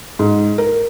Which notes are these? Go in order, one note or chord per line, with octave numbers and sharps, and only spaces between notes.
G#2
A#4